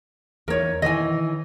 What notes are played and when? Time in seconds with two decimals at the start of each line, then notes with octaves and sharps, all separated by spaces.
0.48 E2 D#4 A#4 C#5
0.82 D#3 E3 D#5 G#5